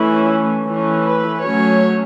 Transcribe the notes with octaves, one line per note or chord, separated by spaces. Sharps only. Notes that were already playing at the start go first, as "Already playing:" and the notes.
Already playing: E3 A3 C#4 E4
E3 A3 C#4
B4
F#3 A3 C#4 C#5